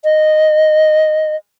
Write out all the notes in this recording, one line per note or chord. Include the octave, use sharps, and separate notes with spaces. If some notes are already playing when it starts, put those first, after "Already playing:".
D#5